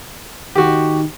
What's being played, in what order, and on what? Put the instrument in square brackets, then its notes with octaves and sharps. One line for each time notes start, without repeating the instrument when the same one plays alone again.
[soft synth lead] D#3 [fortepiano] F#4 G4